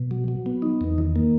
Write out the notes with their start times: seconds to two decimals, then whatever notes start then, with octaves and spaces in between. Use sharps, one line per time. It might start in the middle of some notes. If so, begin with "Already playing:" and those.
Already playing: B2
0.11 F#3
0.28 F#3
0.46 B3
0.62 D#4
0.81 E2
0.98 D#3
1.16 A#3